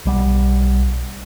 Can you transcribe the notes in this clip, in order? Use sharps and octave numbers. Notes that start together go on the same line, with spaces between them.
B1 G3 B3